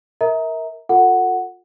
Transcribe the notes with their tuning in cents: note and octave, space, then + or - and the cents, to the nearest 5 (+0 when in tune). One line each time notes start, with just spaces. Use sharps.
A#4 +0 E5 -35 A#5 +0
F4 +40 A4 +30 F#5 +0